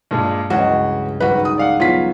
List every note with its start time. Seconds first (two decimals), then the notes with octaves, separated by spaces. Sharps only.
0.11 G2 A#2 G#3
0.50 C#2 G2 E3 G#3 C#4 F#4
1.20 G#1 G3 F#4 B4
1.45 D#6
1.58 D5 F5 F#5
1.80 F#3 B3 F4 B6